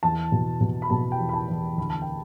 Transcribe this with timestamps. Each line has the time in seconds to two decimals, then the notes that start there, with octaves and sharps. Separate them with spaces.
0.03 E2 A5
0.32 B2
0.61 B2
0.82 B5
0.90 B2 A5
1.12 G5
1.20 E2
1.29 B5
1.34 A5
1.49 E2
1.77 D2 B5
1.90 A5
2.02 G5